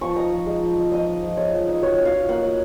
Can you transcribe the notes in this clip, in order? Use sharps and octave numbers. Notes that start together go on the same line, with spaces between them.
F3 C#6
D#4 A#5
F3
G#3
F3
D#4
F3 D#5
D#4
F3
G#3 C#5
F3
D#4
F#3 C#5
C#4
F5
F4
A#3 F#5
F#3